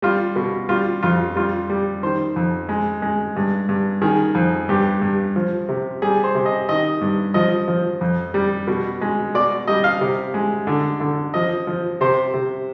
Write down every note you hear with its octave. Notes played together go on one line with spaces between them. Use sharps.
G3 F4
B2
G3 F4
F2 F4
G3 F4
G3
D#3 C5
F2
G#3
G#3
G2
G2
D#3 G#4
F2
G2 G4
G2
F3
C3
G3 G#4
C5
C3
D#5
D#3 D#5
G2
F3 D#5
F3
F2
G3
B2
G#3
B2 D5
G3 D#5
F5
C3
G#3
D3
D3
F3 D#5
F3
C3 C5
C3